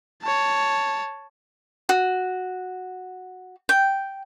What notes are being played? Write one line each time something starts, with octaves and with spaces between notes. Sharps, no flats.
C#5 A5
F#4
G5